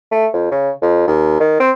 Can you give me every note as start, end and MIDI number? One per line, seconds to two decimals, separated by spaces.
0.12 0.26 57
0.33 0.51 41
0.51 0.70 49
0.82 1.07 41
1.08 1.38 39
1.40 1.57 51
1.60 1.71 60